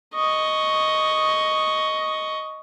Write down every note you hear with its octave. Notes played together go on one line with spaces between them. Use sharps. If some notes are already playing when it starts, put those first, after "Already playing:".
D#5 C#6